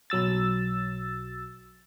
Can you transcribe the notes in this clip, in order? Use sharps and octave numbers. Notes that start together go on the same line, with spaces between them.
B1 F#3 E6 A6